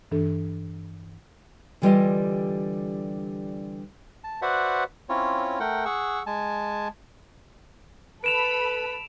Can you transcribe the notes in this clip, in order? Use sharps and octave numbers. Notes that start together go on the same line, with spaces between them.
G2 E3 D4 A4
D3 E3 G3 F4 G4 D#5
A5
F#4 B4 C5 D5 E5 F#5
C4 C#4 E4 F4 C#5
A3 A#4 F#5 G5
G#4 F#5 C#6 E6
G#3 G#5 A5
A4 B4 B5 D7 E7 F7